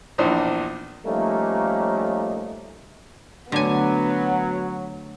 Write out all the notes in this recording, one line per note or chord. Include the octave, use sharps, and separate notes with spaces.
A#1 E2 D4 D#4 C5
F3 G3 A3 A#3 C#4 D#4
D3 F#3 A3 B3 D4 C#5 G#5